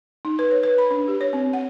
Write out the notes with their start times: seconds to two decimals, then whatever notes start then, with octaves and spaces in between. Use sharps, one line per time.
0.25 D#4
0.39 B4
0.51 C#5
0.63 B4
0.78 B5
0.91 D4
1.08 G4
1.21 C#5
1.33 C4
1.53 F#5